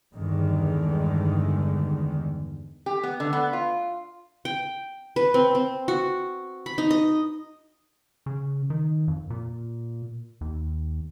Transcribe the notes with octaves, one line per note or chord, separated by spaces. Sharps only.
E2 G2 D3 D#3 G#3
G4
B3
D3
B3
F4
G5
B4
C4
C4
F#4
B5
D#4
D#5
C#3
D#3
F2
A#2
D#2